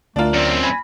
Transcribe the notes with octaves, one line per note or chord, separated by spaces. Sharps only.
D2 A3 D4 F4 A#4
F#2 C4 D5
G#5 B5